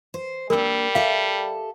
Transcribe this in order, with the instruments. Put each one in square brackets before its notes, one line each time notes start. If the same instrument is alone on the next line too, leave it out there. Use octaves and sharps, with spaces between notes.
[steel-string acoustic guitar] C5
[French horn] G3 [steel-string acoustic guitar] A#3 D4 [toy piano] A#4 E6
[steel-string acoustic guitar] G4 A4 E5 [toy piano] F5